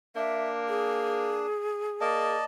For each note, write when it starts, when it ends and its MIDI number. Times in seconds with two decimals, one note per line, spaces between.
0.16 1.52 58
0.16 1.47 62
0.16 0.48 76
0.69 2.35 68
2.01 2.43 58
2.01 2.45 74
2.01 2.45 75
2.01 2.45 81